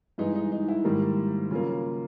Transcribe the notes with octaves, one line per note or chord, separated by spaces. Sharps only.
G2 E3 G#3 D#4
D#4
D#4
E4
G#2 D#3 G3 A#3
C#3 F#3 A#3 F4